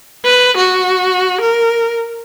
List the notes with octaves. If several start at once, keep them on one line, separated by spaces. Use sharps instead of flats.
B4
F#4
A#4